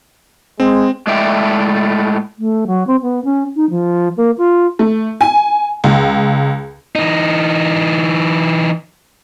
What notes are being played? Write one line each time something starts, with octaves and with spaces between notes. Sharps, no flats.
G#3 C4
A2 G#3 A3 D5 E5 G5
A3
F#3
C4
B3
C#4
D#4
F3
A#3
F4
A3
G#5
C#2
E3 D#4